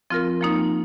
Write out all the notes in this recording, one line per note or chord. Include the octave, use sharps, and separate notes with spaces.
F3 C4 F4 A#4
F3 A#3 D#4